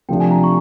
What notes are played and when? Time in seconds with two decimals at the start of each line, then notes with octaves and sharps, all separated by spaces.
0.09 C3 F3 A3 D4 G5
0.20 G#5
0.31 A#5
0.44 C#6